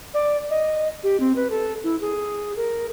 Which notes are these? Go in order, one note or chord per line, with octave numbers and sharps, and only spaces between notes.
D5
D#5
G4
C4
B4
A4
E4
G#4
A#4